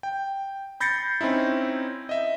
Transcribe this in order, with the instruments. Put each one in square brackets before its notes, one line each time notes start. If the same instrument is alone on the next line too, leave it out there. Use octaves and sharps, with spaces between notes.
[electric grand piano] G5
B5 G6 A6 A#6 C7 C#7
C4 C#4 D#4 E4
D#5 E5